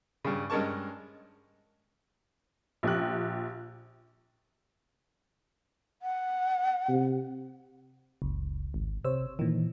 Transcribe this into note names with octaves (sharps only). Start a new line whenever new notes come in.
G2 C#3
G2 G#3 C#4 A#4 A5 C#6
A#1 G4 F#6
F#5
C3
F#1 C#2
G#1
C3 C5 C#5 E6
A#2 D#3 E3